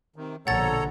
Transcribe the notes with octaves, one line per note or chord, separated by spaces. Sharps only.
C3 D#3
A#1 B2 D3 A4 C#5 F#5 A#5 A6